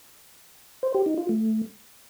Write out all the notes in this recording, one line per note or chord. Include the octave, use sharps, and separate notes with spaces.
C5
G4
D#4
F4
A3